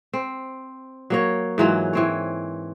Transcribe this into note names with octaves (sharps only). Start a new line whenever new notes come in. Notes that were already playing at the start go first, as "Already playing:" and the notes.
C4
F#3 A#3 C#5
G#2 E3 F#3 F4
E3 C4 C#5